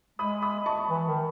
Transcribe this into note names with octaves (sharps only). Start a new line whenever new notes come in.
G#3 B5 D#6
B5 D#6
A5 C#6
E3
D#3